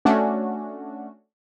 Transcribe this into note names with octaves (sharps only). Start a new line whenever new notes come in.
A3 C#4 D4 F#4